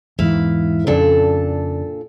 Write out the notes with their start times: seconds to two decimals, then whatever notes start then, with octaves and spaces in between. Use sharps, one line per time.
0.19 E2 G#2 E3 E4 F5
0.87 F2 A#2 C#3 D4 A4